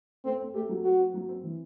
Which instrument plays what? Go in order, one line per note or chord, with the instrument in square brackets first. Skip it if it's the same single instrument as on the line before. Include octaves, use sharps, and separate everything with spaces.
[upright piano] A3 [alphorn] C4
[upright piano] C4
[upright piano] A3 [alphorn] G4
[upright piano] F#3
[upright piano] C4 [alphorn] F#4
[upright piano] C4
F#3
C4
E3